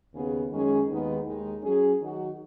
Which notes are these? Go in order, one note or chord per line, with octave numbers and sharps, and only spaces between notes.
D#2 C#3 B3 G#4
F#2 D#3 G#3 C#4 G#4
D#2 D#3 G#3 B3 D#4
D#2 D#3 G#3 D#4
F#3 C#4 G#4
D#3 F#3 D#4 F#4